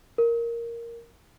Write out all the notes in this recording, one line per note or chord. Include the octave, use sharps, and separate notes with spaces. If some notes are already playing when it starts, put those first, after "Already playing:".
A#4